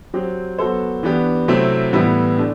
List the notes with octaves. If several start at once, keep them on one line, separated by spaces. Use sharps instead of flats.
F#3 C4 G4
F#3 B3 F#4 A4 C5
E3 B3 D4 G4
C3 F#3 A3 C4 E4
A2 E3 G3 B3 E4
D3 A3 D4